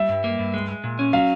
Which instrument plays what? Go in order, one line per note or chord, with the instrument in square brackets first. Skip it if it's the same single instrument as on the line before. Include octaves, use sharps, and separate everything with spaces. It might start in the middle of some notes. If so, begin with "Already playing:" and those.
Already playing: [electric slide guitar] G3 [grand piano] E5
[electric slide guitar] G2
A#3
G2
G#3
G#3
A#2
C#4
[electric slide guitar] F#3 [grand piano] F5